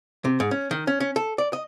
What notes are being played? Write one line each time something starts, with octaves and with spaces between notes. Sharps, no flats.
C3
G#2
C#4
D#3
C#4
C#4
A4
D5
D#5